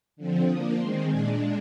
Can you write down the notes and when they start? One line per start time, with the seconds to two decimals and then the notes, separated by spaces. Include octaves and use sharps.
0.17 D3 F3 C4
0.48 F3 A#3 D4 D#6
0.77 D#3 G#3 C4 C6
1.09 A#2 G#3 D4 G#5